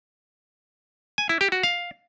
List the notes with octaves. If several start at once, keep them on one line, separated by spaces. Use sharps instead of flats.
G#5
E4
G4
F#4
F5